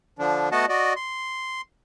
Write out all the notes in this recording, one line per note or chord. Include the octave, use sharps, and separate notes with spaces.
D3 F3 D4
A3 B3 F#4 D#5 F#5 A5
F#4 D5 D#5
C6